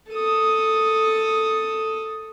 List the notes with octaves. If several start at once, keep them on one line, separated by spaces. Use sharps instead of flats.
A4 D#6